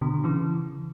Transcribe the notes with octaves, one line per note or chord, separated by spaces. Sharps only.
B2 D3
D3
C#3 E3